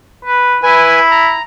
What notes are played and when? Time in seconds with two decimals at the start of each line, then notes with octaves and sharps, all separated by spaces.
0.25 B4
0.63 E4 B4 G#5
1.11 A#5